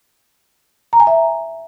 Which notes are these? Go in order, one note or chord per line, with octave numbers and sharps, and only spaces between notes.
A#5
G#5
E5